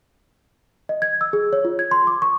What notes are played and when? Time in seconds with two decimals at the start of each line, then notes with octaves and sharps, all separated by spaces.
0.89 D#5
1.02 G#6
1.21 E6
1.33 G#4
1.53 C#5
1.65 F4
1.79 G#6
1.91 C6
2.07 D6
2.22 C#6